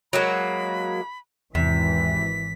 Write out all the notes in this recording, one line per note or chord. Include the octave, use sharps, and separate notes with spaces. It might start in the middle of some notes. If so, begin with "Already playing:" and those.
F#3 G#3 A#3 B5
G#1 E2 C3 E3 B6